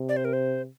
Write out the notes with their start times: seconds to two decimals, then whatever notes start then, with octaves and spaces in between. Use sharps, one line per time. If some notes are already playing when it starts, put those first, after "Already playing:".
Already playing: C3
0.09 D5
0.17 C5
0.25 A#4
0.33 C5